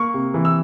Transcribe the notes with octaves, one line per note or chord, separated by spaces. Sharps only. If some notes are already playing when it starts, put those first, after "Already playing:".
Already playing: A#3 C#6
C3
E3
E6